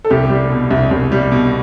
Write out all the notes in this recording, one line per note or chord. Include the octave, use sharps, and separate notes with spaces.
A4
C2 G4
G3
B2
C2
C2
G3
B2